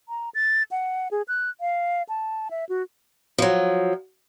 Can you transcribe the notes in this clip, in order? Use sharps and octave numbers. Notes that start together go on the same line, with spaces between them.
A#5
A6
F#5
G#4
F#6
F5
A5
E5
F#4
F3 F#3